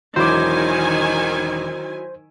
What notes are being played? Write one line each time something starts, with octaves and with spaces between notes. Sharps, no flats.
E1 D#3 F#3 E4 C5 G#5 D6